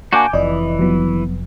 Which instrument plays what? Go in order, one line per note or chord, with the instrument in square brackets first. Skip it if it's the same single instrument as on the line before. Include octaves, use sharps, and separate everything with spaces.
[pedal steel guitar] A#3 D4 F#4 [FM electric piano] G#5 D6 G6
[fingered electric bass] F1 [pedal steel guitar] E3 [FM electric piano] D5 D#5
[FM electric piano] F3 F#3 B3